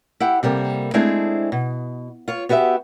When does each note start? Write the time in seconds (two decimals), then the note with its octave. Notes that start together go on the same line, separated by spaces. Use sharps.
0.20 E4 G4 F#5
0.43 C3 G3 A#3 A4
0.94 G#3 A3 C4 D4 E4 G#4
1.52 B2
2.28 F4 C#5
2.49 B3 F#4 G4 D#5 E5